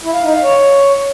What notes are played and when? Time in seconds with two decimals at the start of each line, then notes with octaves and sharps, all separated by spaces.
0.04 E4
0.14 F5
0.24 D#4
0.33 F5
0.43 C#5